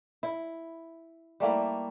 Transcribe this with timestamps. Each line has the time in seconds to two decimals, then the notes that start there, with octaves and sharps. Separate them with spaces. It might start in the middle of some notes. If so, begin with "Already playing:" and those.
0.23 E4
1.40 G3 A3 A#3 E4